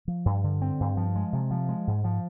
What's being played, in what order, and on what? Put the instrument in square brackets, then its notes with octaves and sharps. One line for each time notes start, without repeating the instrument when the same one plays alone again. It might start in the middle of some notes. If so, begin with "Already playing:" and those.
[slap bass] F3
G2
D3
C4
G2
F3
G#3
C3
F3
G#3
G#2
F3